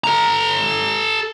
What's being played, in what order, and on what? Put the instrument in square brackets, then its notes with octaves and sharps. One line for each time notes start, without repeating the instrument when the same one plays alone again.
[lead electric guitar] A4 A#5